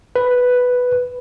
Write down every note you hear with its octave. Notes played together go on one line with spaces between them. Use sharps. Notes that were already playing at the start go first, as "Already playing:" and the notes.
B4